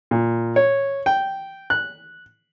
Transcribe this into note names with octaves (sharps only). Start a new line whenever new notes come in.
A#2
C#5
G5
F#6